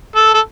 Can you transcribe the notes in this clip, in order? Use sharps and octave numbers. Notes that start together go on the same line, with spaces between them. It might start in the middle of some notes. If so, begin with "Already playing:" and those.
A4
A4